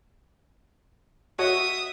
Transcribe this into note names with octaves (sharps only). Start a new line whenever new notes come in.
F#4 C#5 D#5 E5 D#6